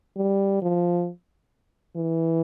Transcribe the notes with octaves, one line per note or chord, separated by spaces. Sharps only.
G3
F3
E3